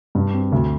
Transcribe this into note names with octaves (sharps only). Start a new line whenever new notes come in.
G2
C4
D2